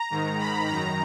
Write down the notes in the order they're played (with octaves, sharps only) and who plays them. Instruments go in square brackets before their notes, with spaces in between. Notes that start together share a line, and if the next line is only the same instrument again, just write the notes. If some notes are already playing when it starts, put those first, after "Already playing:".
Already playing: [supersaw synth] A#5
G#2 D#3
B5
F#2 D#3 A#5